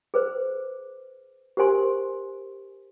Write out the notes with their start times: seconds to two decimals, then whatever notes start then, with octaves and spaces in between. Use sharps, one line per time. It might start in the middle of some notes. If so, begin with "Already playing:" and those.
0.14 G#4 B4 C5
1.57 G4 A#4 C5 G#5 C6